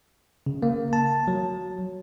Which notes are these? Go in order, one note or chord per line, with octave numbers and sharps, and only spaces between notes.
C#3
A#3
A5
F#3